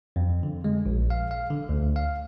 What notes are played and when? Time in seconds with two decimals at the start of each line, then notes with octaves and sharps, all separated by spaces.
0.16 F2
0.43 D3
0.64 G#3
0.86 A#1
1.10 F5
1.31 F5
1.50 D3
1.69 D2
1.96 F5